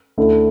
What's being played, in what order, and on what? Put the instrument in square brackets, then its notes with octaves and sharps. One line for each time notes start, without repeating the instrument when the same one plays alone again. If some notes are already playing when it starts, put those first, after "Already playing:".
[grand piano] D2 D3 A3 E4